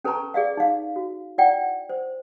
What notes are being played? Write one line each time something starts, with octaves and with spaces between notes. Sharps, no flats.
C#4 A4 B4 A5 A#5 C#6
G#4 D5 E5 F5
D#4 F5
F#4
E4 D5 F#5 G5
C5